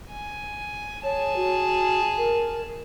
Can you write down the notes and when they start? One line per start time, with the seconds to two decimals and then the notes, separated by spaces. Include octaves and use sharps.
0.11 G#5
1.04 G#4 C#5 A5
1.36 F#4
2.18 A#4